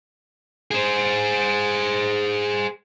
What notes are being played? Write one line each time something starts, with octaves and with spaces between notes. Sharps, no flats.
G#4 C5